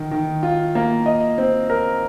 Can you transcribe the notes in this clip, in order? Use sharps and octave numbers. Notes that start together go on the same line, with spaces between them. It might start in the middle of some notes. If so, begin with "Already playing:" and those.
Already playing: D#3
D#3
F4
A#3
D#5
C4
A#4